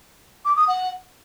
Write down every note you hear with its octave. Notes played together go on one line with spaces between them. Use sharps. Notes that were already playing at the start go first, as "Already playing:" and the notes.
D6
D#6
F#5